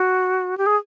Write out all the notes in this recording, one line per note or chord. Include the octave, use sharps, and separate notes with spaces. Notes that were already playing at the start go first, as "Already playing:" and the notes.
Already playing: F#4
G4
G#4